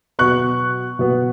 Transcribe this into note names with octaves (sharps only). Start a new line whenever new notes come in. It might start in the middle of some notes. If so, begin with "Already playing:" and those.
B2 F#3 B3 C#6 F#6
B2 F#3 B3